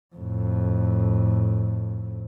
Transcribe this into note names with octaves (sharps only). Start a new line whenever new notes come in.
F2 A2